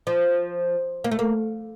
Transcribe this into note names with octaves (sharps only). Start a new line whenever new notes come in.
F3
A#3
A3
A#3